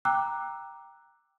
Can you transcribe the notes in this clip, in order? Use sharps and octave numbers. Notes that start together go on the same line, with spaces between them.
G5 A#5 D6 E6 F#6